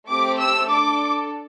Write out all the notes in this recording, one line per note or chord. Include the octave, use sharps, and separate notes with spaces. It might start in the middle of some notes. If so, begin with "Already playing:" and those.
A3 C4 G4 D6
E6
D4 A4 D6